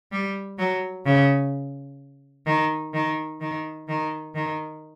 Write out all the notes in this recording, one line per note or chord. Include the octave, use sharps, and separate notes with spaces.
G3
F#3
C#3
D#3
D#3
D#3
D#3
D#3